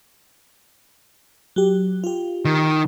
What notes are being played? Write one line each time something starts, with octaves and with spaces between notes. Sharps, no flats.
F#3 G4
F4 G4
D#3